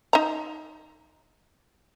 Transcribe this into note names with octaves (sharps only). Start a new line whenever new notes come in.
D#4 A#5